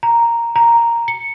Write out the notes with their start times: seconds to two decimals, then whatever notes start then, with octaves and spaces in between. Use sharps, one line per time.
0.03 A#5
0.56 A#5
1.08 C#7